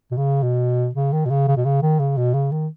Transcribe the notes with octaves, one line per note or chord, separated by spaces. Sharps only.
B2
C#3
B2
C#3
D#3
B2
C#3
C#3
B2
C#3
D#3
C#3
B2
C#3
D#3